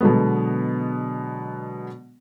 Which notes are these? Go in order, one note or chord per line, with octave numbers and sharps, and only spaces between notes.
B2 D3 F#3 G#3 B3